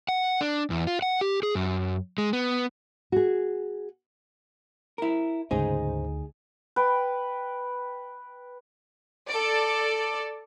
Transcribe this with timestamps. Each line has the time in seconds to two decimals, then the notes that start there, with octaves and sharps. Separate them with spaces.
0.09 F#5
0.41 D4
0.70 E2
0.87 F4
1.02 F#5
1.21 G4
1.43 G#4
1.55 F#2
2.18 G#3
2.33 B3
3.12 F#4 G#4
4.98 E4 A#4
5.51 D2 G#2 C#3 D#4 G#4 C5
6.76 B4 G5
9.29 A4 D5